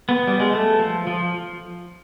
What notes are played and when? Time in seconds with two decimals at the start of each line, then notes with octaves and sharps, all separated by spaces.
0.09 B3
0.27 G3
0.40 G#3
0.51 A3
0.79 F3
1.07 F3